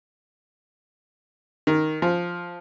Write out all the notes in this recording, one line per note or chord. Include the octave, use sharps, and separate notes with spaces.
D#3
F3